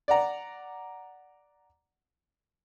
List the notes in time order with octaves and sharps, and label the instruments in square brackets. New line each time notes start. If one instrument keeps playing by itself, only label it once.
[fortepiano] D5 F#5 A#5